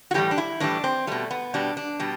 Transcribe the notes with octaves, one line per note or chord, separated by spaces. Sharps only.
F#4
A2 E3 G3 G4
D4
E4
A2 E3 G3 D4
C4
B2 G3 A3
B3
B2 G3 D4
D4
B2 G3